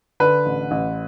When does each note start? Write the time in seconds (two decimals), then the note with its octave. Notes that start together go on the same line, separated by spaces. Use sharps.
0.20 D3 B4
0.46 A1
0.71 A1